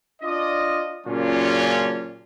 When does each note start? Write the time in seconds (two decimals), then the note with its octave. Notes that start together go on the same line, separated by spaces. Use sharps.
0.22 D4 F4 D5 D#5
1.07 A#2 C#3 F#3 C#4 D4 F4